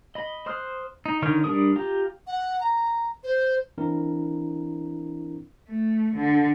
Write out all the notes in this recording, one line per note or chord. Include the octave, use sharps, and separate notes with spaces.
D#5 B5
C5 C6 D#6 F6 F#6
D#4
D3 D#3 D#4 C#5 F6
G3 D4 A#4 D#6
F4 G4 A#5
F#5
A#5
C5
E3 C4 D4 E4 A#4
A3
D3